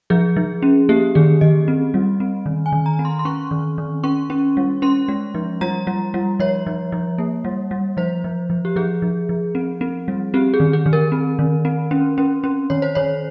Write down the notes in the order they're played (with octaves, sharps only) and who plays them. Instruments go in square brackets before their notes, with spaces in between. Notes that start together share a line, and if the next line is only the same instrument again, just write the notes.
[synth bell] F3 G#4
F3
C#4
A#3 G4
D#3 G#4
D#3 D#5
C4
G3
C4
D#3
G#5
D#3
A#5
C4
C6
C6
C#4 C#6
D#3
D#3
C#4 C#6
C#4
G3
C#4 C6
G#3
F3
G3 A#5
G3
G3
F3 C#5
F3
F3
A#3
G3
G3
F3 C5
F3
F3
G4
F3 G#4
F3
F3
C4
C4
G3
C4 G4
G#4
D#3
G#4
D#3
A#4
C4
D#3
C4
C#4
C#4
C#4
D#3 C#5
C5
D#3 C#5